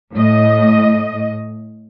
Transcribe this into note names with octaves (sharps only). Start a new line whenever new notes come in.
A2 D#5